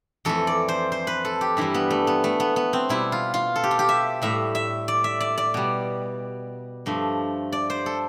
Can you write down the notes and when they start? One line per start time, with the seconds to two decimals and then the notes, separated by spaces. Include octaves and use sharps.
0.25 F2 E3 A3 A4
0.47 D5
0.68 C5
0.92 C5
1.07 B4
1.25 A4
1.41 G4
1.57 G2 E3 G3 E4
1.74 B3
1.90 A3
2.07 B3
2.24 A3
2.40 B3
2.56 B3
2.73 C4
2.89 B2 G3 E4
3.12 F4
3.34 F4
3.56 A4
3.64 G4
3.71 F4
3.79 G4
3.89 E5
4.22 A2 G3 E5
4.55 E5
4.88 D5
5.04 E5
5.21 D5
5.38 D5
5.54 B2 G3
6.86 G2 F3 A3
7.52 D5
7.70 C5
7.86 A4